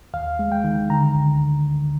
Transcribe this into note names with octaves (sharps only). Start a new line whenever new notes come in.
D#2 F5
G#3
G5
D#3
D3 A#5
D2